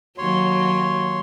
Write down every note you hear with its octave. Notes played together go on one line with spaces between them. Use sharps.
D#2 F#3 C#5 C6